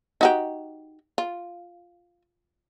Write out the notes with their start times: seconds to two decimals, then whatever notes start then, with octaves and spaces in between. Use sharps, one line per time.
0.21 D#4 F#4 G4
1.18 F4